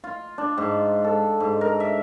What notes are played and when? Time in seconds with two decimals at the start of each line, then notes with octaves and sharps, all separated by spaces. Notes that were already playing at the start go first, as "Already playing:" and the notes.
0.04 F4
0.38 D4
0.58 G#2
1.04 A4
1.40 G#2
1.61 A#4
1.80 E5